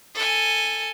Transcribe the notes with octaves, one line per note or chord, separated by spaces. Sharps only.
A4 G#5